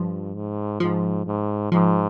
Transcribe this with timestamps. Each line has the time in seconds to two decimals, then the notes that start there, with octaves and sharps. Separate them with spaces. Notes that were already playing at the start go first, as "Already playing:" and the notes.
Already playing: G2 F3
0.35 G#2
0.80 G#2 F3
1.26 G#2
1.72 G#2 F3